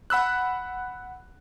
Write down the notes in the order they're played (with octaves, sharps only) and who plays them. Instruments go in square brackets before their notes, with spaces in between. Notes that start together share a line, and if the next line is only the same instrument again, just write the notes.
[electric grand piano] F#5 B5 E6 F#6